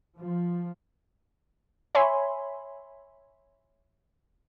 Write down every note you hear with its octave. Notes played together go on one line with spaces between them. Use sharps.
F3
C#5 E5 G#5 B5 C6